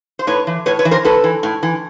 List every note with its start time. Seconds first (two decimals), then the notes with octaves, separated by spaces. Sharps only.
0.19 C5
0.27 A2 B4 C#5
0.47 E3
0.66 A2 B4 C#5
0.79 B4 C#5
0.85 E3
0.91 A#4 C5
1.05 A2 A4 B4
1.24 E3
1.43 A2
1.63 E3